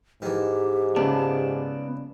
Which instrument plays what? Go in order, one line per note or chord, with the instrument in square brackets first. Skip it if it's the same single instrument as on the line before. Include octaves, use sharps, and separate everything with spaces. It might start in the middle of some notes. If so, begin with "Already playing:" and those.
[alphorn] G#2 [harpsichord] D#3 E3 [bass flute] G4
[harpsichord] C#2 [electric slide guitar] B3 D5 A5